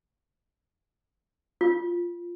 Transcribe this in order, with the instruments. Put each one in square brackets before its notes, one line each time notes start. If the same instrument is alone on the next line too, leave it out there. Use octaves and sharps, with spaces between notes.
[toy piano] F4